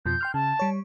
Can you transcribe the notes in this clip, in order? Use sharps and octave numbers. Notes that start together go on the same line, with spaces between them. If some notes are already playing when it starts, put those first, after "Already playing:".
F2 B2 F3 G6
G5 C6 F6
C#3 A5
G3 C#5